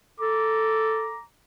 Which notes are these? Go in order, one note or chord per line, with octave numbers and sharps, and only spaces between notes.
A4 A#5 D6